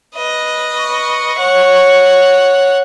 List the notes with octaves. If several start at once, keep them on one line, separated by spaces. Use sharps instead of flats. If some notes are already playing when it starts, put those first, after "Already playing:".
B4 D#5
C#6
C#5 F#5